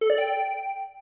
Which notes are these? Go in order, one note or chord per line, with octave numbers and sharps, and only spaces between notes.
A4
D5
G5